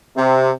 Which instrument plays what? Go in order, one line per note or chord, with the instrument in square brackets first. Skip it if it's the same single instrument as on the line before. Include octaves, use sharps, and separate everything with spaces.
[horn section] C3